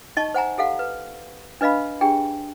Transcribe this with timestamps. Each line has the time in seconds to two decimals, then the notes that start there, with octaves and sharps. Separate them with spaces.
0.17 D#4 D#5 A5 C#6
0.34 C5 F#5 G#5 A#5
0.58 G4 A4 F5 F#5
0.79 B4
1.61 D4 B4 D#5 F5 B5
2.01 D4 G4 G#4 G5